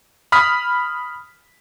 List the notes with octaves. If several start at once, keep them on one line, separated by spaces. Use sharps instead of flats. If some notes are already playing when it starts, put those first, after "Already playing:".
B5 D#6 F6 B6